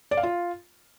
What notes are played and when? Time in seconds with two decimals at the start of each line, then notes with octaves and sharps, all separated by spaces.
0.11 D5
0.17 F5
0.23 F4